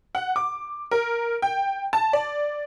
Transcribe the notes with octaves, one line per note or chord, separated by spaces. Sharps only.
F#5
D6
A#4
G5
A5
D5